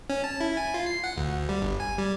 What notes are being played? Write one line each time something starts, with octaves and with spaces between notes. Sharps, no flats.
C#4
A5
E4
G#5
F4
C7
F#5
D2
G3
G1
G#5
G3